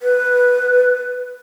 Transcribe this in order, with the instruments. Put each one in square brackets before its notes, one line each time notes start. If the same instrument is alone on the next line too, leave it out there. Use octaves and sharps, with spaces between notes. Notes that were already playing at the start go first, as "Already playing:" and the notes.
[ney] B4